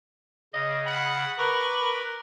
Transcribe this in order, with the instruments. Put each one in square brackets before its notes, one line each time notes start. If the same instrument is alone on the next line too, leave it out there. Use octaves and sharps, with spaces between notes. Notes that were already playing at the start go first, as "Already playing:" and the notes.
[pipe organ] C#3 [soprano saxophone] D#5
[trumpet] F#5 [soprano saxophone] B5
[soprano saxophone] A#4 [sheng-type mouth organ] B4 [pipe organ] B5 C#6 [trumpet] D6
[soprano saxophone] A#4